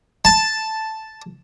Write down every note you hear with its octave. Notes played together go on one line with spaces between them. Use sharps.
A5